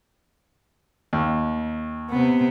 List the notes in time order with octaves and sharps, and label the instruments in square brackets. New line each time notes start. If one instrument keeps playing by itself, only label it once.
[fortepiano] D#2
[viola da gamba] C3 B3